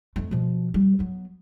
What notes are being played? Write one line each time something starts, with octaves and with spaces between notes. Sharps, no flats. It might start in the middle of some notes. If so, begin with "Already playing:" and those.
F2 A3
B2 F3
G3
F#3 B3